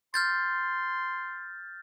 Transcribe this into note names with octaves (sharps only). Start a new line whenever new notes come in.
C6 F6 G6 A6